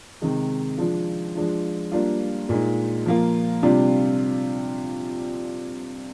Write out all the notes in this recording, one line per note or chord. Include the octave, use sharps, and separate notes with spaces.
C3 D#3 G#3 D#4
F3 G#3 D4 F4
F3 G#3 D4 F4
G3 A#3 D4 F4
A#2 G#3 D#4
F3 A#3 F4
C3 G3 D4 F4